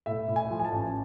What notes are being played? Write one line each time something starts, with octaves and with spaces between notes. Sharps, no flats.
A2 E5
A2
G#5
F3
G#5
A5
A1